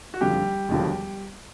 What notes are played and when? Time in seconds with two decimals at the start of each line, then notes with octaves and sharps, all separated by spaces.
0.14 F#4
0.21 F#1 F2 D3 F3 G3 G4
0.69 E1 D#2 D3 F3